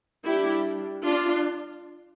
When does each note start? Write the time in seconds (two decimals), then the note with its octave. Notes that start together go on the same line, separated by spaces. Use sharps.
0.25 G3 D4 E4 G4
1.06 D4 F4